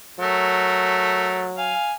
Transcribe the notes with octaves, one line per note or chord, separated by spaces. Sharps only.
F#3 A3 A#4
F5 G#5